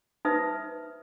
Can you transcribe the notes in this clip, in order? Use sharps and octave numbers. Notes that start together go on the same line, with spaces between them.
D#4 B4 C5 E5 D#6